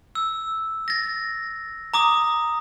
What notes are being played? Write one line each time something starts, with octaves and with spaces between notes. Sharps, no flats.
E6
A6 A#6
A#5 D6 D#6